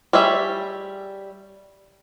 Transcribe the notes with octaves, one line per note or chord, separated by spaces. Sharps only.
G3 G#4 C#5 E5